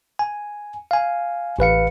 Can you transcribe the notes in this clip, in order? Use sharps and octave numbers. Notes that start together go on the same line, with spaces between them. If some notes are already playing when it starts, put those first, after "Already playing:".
G#5
F5 G#5
A1 B4 F5 C#7